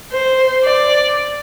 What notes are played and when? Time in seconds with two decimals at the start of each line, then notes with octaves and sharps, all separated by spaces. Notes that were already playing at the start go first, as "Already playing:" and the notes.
0.12 C5
0.64 D5